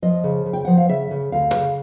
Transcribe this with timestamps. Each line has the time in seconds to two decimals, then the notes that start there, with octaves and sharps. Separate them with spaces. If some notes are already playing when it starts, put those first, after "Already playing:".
0.02 F3 D#5
0.24 C#3
0.46 C#3
0.53 G5
0.65 F3 F#5
0.78 F5
0.89 C#3 E5
1.11 C#3
1.32 D2 F5
1.54 C#3